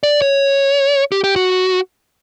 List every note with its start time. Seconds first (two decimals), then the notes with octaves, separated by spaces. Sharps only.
0.03 D5
0.22 C#5
1.12 G4
1.24 G4
1.36 F#4